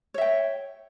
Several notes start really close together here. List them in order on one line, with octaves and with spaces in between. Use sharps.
C#5 E5 G5